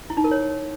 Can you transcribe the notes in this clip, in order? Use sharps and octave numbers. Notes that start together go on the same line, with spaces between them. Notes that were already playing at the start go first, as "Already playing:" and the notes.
E4
D#4
A#4
C#5